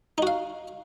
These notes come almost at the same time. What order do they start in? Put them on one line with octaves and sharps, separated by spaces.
D#4 F#4 F5